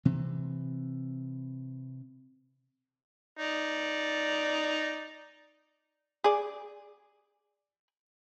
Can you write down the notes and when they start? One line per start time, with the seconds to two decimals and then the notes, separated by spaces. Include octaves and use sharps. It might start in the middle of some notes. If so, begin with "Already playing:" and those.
0.05 C3 E3 C4
3.39 D#4 D5
6.24 G#4 D5